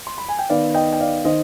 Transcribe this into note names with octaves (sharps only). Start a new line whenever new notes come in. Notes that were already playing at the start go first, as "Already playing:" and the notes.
C6
B5
G#5
G5
D#3 B3 D5 F5
D#5 G5
G5
D5 F5
D#3 C5 D#5